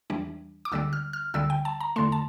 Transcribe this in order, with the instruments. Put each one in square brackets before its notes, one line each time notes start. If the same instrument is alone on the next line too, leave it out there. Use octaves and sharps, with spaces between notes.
[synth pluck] E2 E3 G3 D4
D6
D2 D3 G3 E6
F6
F6
D2 D3 G3 E6
G5
A5
A#5
E2 D3 A3 C6
A5